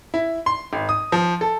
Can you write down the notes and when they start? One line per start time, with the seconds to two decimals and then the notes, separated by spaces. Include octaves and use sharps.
0.14 E4
0.46 C6
0.73 G#1
0.89 D#6
1.12 F3
1.41 A4